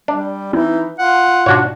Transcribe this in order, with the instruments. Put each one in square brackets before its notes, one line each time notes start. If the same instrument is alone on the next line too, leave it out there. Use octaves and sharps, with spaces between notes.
[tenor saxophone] G3 [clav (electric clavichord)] D4
[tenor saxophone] E3 [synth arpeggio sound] C4 E4 [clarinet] D#4
[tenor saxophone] F4 [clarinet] F#5
[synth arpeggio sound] G#2 B2 [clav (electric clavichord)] D4 F#4 C#5